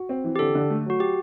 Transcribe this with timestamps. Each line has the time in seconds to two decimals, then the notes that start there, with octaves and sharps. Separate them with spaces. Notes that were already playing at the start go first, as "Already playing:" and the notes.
Already playing: F#4
0.09 C4
0.24 E3
0.36 G4
0.39 D3 A4
0.55 D3
0.70 A3
0.85 F#3 F#4
1.00 G4